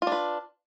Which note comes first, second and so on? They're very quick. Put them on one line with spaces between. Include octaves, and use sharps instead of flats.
F4 D4 B4